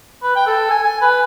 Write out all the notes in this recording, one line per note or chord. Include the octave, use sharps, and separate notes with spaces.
B4
G5
A4
G#5
G#5
B4